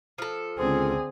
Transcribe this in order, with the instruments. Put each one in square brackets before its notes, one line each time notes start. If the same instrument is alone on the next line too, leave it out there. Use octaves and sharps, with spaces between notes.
[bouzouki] F3 A4
[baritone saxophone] C#2 [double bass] D3 C4 [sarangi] G#4